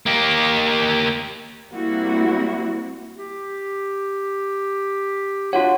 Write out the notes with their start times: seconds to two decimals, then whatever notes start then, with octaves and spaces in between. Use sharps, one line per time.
0.06 A#3 G4
1.70 G3 A#3 C4 E4 F#4
3.17 G4
5.53 D4 F4 F#4 C#5 F#5